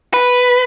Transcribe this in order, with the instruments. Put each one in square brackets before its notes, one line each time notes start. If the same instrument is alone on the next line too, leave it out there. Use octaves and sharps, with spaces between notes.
[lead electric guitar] B4